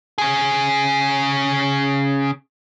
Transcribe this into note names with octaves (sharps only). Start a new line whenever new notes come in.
C#3 G#4